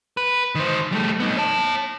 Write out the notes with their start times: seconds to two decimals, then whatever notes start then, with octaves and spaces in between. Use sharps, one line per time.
0.17 B4
0.55 D#3 C5
0.92 G3 A3
1.20 B3 D#4
1.37 C#5 A5